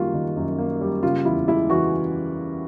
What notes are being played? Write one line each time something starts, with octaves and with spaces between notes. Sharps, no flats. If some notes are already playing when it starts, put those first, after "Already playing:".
Already playing: F#2 D#3 G3 A#3 F4 F#4
D#3
F#2
A#3
G3
C#3 F4
E2 E4
G#3 E4
E3 F#4